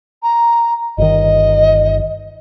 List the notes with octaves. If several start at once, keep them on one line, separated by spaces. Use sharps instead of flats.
A#5
G1 D#3 D#5